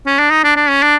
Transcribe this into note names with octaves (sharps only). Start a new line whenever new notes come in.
C#4
D4
D#4
D4
D4
C#4
D4